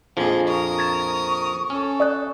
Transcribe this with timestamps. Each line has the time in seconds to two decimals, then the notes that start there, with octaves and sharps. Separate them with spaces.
0.17 A#1 F2 F3 G#4 D#5
0.47 A#4 C#6 D#6
0.79 G#6 A6 E7
1.70 C#4 A4
2.00 D5 D#6 F#6